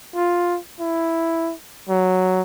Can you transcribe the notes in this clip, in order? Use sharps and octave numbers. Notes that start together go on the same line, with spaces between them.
F4
E4
F#3